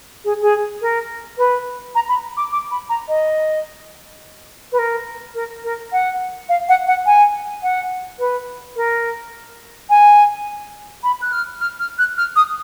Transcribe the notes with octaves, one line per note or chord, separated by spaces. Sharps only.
G#4
G#4
A#4
B4
A#5
B5
D6
D6
B5
A#5
D#5
B4
A#4
A#4
A#4
F#5
F5
F#5
F#5
G#5
F#5
B4
A#4
G#5
B5
F#6
F6
F6
F6
F#6
F6
D#6